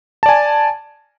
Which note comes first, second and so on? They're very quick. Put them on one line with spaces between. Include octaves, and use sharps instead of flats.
A5 D5 G#5